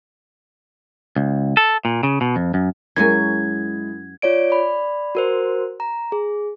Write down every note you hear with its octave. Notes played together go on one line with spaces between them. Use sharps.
C#2
A4
A#2
C#3
B2
F2
F#2
F#2 F#3 G#3 E4 G#5 G#6
F4 C#5 D5 D7
D5 B5
F#4 A#4 C5
A#5
G#4